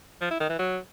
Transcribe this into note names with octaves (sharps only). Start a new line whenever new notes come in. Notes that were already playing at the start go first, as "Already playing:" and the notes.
F3
E4
D#3
E3
F#3